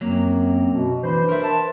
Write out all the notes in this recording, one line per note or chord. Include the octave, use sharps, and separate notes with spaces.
F#2 F#3 A#3 C4
B2
E3 D4 B4 C5
A#4 E5
B4 C5 A5